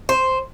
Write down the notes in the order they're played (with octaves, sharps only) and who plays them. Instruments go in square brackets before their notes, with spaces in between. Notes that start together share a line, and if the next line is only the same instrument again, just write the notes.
[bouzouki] C5